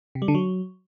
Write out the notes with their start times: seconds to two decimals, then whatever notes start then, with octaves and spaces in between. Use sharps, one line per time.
0.15 C3
0.22 G3
0.28 D3
0.35 F#3